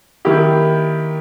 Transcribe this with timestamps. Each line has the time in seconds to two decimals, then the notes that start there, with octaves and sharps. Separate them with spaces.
0.25 D#3 A#3 E4 G4